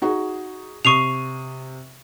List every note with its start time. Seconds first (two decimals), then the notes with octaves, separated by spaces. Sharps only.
0.02 D#4 F#4 G#4
0.85 C3 C#6 D#6 C7 D#7 F7